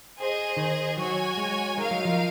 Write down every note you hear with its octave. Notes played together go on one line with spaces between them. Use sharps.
G#4 C5 D#5
D#3
F#3 F#4 C#5 G#5
G#3
G#3 D#4 A#4 F5
F#3
F3